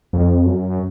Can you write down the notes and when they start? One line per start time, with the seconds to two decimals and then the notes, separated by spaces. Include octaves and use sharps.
0.13 F2
0.45 F#2